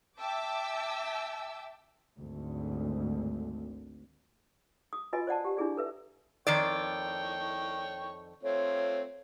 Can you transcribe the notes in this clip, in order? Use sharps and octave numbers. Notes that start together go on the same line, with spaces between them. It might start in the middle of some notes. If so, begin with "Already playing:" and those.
E5 G5 A5 D6 E6
G#1 D2
D#6
F4 F#4 B4 D#5 G#5 B5
C5 D5 F#5 A5
G4 F#5
D4 E4 G#4 D5
A4 B4 E5
F2 D#3 C#5 D5 G5 C#6
A3 C4 F4 C#5